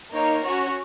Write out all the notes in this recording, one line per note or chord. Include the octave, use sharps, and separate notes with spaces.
A#3 D#4 A#4 C#5
C#4 F#4 C#5